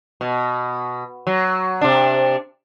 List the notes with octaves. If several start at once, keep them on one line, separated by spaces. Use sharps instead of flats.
B2
F#3
C3 D4